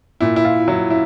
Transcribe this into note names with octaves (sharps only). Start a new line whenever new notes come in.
A#2 E4
E4
F4
F#3 E4
E4